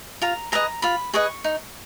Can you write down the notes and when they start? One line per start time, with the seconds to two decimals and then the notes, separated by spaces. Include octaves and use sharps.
0.22 F4 A#5
0.52 G#4 B4 D#5 A#5
0.82 F4 B5
1.14 G#4 B4 D#5 C#6
1.44 D#4